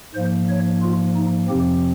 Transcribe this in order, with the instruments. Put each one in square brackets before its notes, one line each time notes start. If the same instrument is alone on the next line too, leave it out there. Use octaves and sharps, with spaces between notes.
[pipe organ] G#2 F3 A#3 C5
C#5
F4
D#4
F2 C3 F3 C4 G4